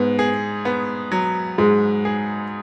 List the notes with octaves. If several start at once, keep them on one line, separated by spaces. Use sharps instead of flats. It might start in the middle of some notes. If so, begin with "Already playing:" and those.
Already playing: G#2 B3
G#4
B3
F#3
G#2 G#3
G#4